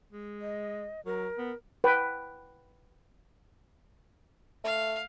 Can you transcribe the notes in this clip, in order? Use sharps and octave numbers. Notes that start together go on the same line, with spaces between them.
G#3
D#5
F#3 A#4
B3
B4 G5
A3 F5